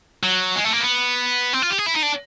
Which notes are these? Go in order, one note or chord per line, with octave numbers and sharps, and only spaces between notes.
F#3
G#3
A3
A#3
B3
C4
F4
G4
G#4
E4
D#4
D4